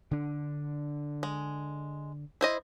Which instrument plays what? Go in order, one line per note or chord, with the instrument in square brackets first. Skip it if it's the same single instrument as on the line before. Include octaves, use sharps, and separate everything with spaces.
[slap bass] D3 D4
[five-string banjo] G#3
E4 C5 D#5